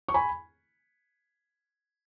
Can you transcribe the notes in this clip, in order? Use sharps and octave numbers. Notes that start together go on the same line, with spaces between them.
C#6
G#5 B5